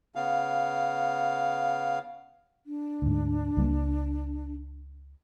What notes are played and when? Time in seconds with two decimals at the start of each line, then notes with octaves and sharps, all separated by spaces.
0.15 C#3 B3 F5
2.65 D4
3.02 D2 G#2
3.57 C#2 G3 A#3